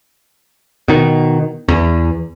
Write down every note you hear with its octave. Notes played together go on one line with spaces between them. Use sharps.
B2 D#3
E2